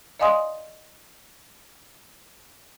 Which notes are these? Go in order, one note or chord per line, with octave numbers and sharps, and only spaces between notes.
D5 D#5 F5 G#5 C6 D#6